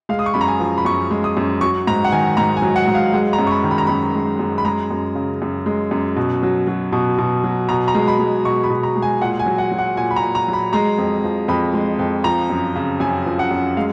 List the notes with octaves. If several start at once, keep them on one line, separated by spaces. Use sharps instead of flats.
G#3 F5
D#6
C#6
F#2 B5
A#5
G#5
F3
B5
F#2 C#6
G#3
D#6
F#2
F#3 C#6
G#2 A#5
F#5
D#3 G#5
G#2 A#5
G#5
F#3
F#5
G#2
F5
G#3 F#5
A#5
F#2
C#6
B5
D#3
B5
A#5
F#2 B5
G#3
F#2
B5
G#3 A#5
F#2
C#3
F#2
G#3
F#2
B2
F#3
F#3
B2
B2
F#3
B2 A#5
A#5
G#3
B5
G#3
B2 C#6
B5
B2
A#5
G#3
G#5
A#2 F#5
G#5
F#3
F#5
F#3
F#5
A#2 G#5
B5
A#5
A#2
A#5
F#3
B5
G#3 A#5
F2
F3
F2 B5
G#3
F2
F3 A#5
F#2
C#3
F#2 G#5
F3
F#5
F#2
G#3 F5